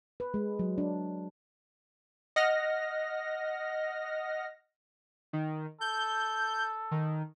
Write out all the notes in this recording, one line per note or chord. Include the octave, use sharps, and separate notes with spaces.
B4
G#3
F#3
D4
D#5 F#5 F6 A#6
D#3
A4 G6
D#3